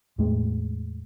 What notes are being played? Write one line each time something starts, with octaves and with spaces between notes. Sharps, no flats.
E2 A2 G#3